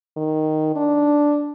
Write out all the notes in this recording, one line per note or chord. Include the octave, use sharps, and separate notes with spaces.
D#3
D4